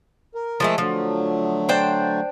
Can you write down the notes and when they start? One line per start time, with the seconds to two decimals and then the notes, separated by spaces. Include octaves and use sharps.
0.35 A#4
0.60 F3 G#3 A3
0.78 D3 F3 F#3 A3
1.69 D4 C5 G5